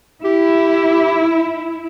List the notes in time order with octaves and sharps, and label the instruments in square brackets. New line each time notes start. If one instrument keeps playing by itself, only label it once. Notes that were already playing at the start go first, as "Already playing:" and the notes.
[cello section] E4 [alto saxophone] G4